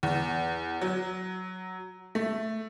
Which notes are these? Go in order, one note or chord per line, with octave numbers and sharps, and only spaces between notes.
E2
F#3
A3